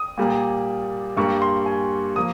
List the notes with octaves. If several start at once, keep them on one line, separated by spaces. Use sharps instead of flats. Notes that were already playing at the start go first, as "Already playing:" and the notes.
Already playing: D#6
A#2 G3 A#3
G2 G3 A#3 C#6
C6
G#5
F3 A#3 D#6